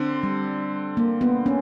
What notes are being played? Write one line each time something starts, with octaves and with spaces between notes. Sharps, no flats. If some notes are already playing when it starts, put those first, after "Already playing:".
Already playing: D3 C4
G3
A#3
B3
C#4